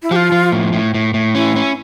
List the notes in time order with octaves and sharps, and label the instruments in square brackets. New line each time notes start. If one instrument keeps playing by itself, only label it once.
[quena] E4
[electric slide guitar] F3 [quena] G4
[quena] F4
[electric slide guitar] F3
A2
A2
A2
A2
[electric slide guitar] C#4 [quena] E4
[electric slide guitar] C#4